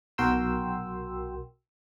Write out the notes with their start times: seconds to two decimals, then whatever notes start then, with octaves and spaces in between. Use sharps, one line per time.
0.18 B1 F#4 A#4 G5 C6 E6